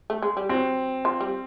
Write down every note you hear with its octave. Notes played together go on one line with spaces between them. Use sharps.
A3
G#3
G3
F#3 C4
F3
G3